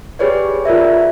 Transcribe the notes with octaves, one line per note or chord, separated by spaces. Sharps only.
G4 G#4 B4 C#5 D5
F4 A#4 D5 E5